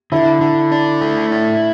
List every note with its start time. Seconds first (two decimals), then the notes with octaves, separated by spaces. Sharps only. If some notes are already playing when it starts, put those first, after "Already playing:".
0.12 D3 E4
0.41 D3
0.72 D4
1.01 A3
1.32 E4